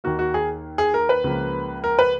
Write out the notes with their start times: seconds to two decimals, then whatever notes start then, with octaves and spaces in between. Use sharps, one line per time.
0.04 D#2 D#3 A#3 F#4
0.19 F#4
0.34 G#4
0.78 G#4
0.94 A#4
1.09 B4
1.24 C#2 C#3 F3 A#3
1.84 A#4
1.99 B4